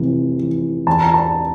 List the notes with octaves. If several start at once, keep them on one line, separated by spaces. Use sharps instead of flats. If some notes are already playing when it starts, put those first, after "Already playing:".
Already playing: F1 C3 E3
E3
E2 A5
A#5
A5